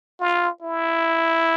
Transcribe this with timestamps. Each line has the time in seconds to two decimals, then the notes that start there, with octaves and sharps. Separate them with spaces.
0.20 F4
0.62 E4